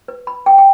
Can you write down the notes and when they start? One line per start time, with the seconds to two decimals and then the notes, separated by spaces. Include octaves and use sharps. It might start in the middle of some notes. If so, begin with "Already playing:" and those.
0.08 B4
0.27 B4 B5
0.46 B4 G5
0.58 G5